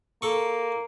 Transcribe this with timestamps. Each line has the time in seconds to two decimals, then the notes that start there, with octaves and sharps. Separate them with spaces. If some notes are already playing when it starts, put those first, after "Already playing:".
0.22 A#3 A4 C#6